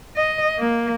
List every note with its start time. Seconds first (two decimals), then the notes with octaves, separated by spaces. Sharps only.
0.16 D#5
0.59 A#3